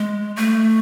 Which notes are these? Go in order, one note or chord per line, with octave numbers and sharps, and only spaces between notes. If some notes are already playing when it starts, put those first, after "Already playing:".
Already playing: G#3
A3